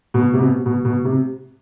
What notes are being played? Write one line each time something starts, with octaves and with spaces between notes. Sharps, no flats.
B2
C3
B2
B2
B2
C3